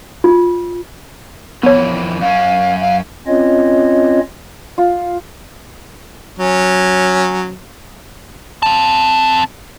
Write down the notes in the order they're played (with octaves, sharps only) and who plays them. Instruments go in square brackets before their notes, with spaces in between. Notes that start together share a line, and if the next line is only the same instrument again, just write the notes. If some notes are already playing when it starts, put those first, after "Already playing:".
[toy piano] F4
[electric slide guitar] F2 D#3 E3 [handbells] B3 C#5
[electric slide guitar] F#2 F#3 C#4 [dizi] F5
[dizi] F5
[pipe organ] C4 C#4 F4 C#5 D#5
[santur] F4
[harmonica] F#3 C#4
[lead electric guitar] C4 A5